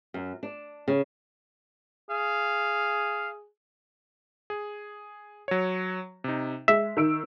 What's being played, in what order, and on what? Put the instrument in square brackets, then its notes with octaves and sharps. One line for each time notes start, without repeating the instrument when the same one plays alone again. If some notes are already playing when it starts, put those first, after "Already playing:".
[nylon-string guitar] F#2
D4
C#3
[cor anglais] G#4 [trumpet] F5
[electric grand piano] G#4
F#3 C#5
C3 D#4
[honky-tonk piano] G#3 [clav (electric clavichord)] E5 [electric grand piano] B6
[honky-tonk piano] D#3 E6 D7